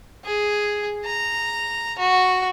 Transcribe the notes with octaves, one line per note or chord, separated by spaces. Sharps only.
G#4
A#5
F#4